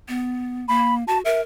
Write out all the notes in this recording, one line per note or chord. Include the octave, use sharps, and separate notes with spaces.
B3
A#3 B5
F#4 A5
A#4 E5